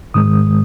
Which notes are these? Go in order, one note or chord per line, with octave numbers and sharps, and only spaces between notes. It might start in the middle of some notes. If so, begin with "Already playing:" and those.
G#2 D#3 G#3 D#6